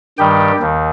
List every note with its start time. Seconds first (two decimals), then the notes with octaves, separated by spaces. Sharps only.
0.18 G2 D#3 G3 G4 G5
0.60 D#2 D#3